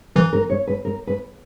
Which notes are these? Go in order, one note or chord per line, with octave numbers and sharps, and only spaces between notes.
E3 A#4
A#4
C#5
B4
A#4
B4